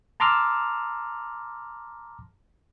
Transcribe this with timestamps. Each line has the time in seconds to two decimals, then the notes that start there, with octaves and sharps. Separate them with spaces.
0.20 A5 A#5 C6 D6 E6 F6